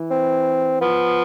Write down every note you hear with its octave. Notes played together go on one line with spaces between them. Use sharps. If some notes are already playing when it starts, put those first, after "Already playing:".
Already playing: E3
C4
F3 B3